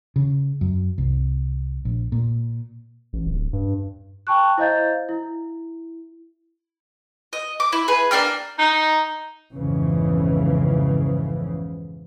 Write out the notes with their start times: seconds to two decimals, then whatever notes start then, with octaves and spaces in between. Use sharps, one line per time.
0.16 C#3
0.61 F#2
0.98 C2
1.85 A#1
2.12 A#2
3.13 A1
3.26 D1
3.53 G2
4.27 G5 A5 C#6 F#6
4.57 E4 C5 D#5 F5 G6 A6
5.09 E4
7.33 D#5
7.60 D6
7.72 E4
7.88 G#4 B4
8.11 A#3 D4 G5 F6
8.59 D#4
9.54 B1 F2 G#2 C#3 E3